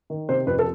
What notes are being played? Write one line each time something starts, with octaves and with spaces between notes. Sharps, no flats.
D#3
C3 C5
F2 B4
A4